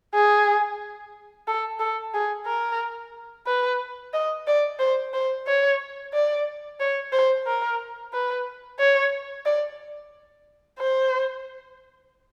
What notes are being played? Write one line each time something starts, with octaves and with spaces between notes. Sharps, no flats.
G#4
A4
A4
G#4
A#4
B4
D#5
D5
C5
C5
C#5
D5
C#5
C5
A#4
B4
C#5
D5
C5